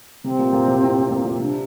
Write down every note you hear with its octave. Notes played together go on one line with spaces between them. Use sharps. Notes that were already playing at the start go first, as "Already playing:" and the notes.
C3 C4
A#2
A#2
C3
A2
A2
A#2
A#2
C3 D4